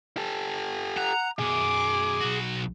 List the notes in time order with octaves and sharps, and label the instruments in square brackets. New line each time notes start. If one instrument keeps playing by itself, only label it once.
[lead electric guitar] G4 A4
[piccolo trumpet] F#5 [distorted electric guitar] A#5
[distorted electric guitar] F#2 B2 [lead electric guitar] G#4 [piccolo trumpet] D6
[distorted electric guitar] B1 F#4